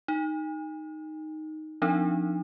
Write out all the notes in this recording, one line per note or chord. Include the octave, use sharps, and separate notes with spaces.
D#4
F3 C4 D4 D#4